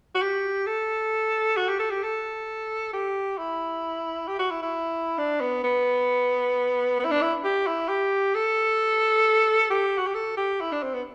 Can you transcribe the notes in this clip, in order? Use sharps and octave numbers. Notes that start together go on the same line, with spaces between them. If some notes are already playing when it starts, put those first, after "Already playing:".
F#4
G4
A4
F#4
G4
A4
G4
A4
G4
E4
G4
F#4
E4
E4
D4
B3
B3
B3
E4
D4
E4
G4
E4
G4
A4
G4
F#4
G4
A4
G4
E4
D4
C4
B3